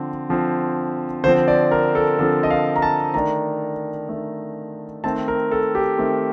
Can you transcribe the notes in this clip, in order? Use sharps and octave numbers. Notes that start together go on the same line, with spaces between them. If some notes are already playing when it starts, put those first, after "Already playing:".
Already playing: D3 F3 C4
D3 F3 C4
D3 F3 C4 C5
D5
A#4
A4
D3 F3 C4 A4
D#5
F5
A#5
A5
D#3 A3 D4 A#5
D#3 A3 D4
D#3 A3 C4 A5
A#4
A4
G4
D#3 A3 C4